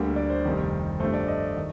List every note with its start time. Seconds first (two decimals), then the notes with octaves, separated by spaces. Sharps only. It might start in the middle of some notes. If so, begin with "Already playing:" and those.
Already playing: D2 D3 G3 A#3
0.16 D5
0.30 C5
0.44 F1 F2 D#3 G3
1.00 G2 F3 A3 C5
1.14 D5
1.28 D#5
1.57 D#3